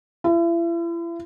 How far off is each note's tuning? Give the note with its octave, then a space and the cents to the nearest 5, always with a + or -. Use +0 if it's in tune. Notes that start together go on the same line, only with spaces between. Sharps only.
E4 +40